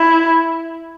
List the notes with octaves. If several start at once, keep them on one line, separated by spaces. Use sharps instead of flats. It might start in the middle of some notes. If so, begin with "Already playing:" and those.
Already playing: E4